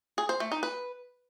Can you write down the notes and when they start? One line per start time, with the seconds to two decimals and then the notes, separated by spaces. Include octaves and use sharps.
0.18 G#4
0.29 C5
0.40 A3
0.52 D#4
0.63 B4